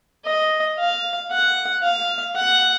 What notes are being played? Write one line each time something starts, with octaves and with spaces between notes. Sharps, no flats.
D#5
F5
F#5
F5
F#5